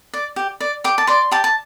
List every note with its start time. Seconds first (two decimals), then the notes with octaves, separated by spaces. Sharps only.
0.14 D5
0.36 G4
0.60 D5
0.84 G4 D6
0.98 A5
1.07 D5 C6
1.31 G4 A5
1.44 A5